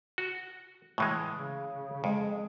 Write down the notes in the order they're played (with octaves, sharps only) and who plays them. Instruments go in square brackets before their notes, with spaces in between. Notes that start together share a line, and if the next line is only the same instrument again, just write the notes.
[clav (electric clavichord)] F#4
A2 E3 G#3
[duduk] C#3
[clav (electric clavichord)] F2 [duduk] G#3